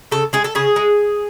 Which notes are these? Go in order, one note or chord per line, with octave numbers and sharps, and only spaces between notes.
C#3 A4
G#3 G#4
A4
C#3 G#4
G#3